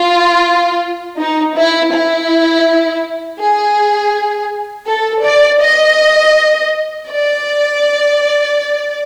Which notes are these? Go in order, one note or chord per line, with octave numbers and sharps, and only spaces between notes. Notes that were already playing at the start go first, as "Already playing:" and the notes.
Already playing: F4
D#4
E4
E4
G#4
A4
D5
D#5
D5